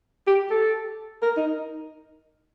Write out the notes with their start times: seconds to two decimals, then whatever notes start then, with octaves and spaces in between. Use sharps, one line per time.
0.27 G4
0.50 A4
1.22 A#4
1.37 D#4